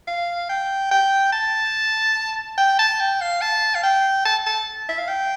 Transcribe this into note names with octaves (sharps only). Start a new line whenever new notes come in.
F5
G5
G5
A5
G5
A5
G5
F5
A5
F5
G5
A5
A5
E5
F5
G5